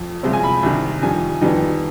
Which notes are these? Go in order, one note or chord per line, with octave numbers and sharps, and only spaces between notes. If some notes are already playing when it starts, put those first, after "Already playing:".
Already playing: F2
C2 C3 F3 G#3 C4 C5
G#5
B5
C2 C3 D#3
F2 D#3 G3 G#5
F2 D#3 G3 B3 D#4